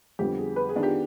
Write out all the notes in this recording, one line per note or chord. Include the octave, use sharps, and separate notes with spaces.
F2 D3 G3 B3 G4
G#4
B4
G#4
D#3 B3 D4 F4
G4